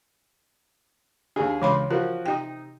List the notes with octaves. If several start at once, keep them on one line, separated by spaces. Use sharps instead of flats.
D#2 D4 G4 G#4
C#2 C#3 E3 B5 C6
F3 F#4 A#4
C3 D#4 G5 D#6